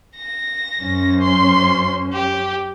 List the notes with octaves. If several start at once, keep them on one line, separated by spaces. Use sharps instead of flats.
A#6
F#2 C#4 C5
C6
G4